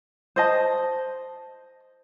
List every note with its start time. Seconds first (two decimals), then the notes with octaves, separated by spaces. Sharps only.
0.36 C5 D#5 A5